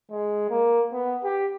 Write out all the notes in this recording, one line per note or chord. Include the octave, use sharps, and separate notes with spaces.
G#3
A#3
B3
G4